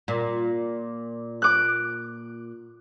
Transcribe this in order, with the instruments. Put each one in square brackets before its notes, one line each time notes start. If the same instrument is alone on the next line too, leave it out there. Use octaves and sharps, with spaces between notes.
[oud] A#2
[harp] D6 F#6